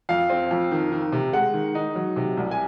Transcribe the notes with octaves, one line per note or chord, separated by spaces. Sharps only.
F2 F5
C4
F2
D#3
D#3
C3
G#3 F#5
D#3
D#4
F#3
C3
C2
G#5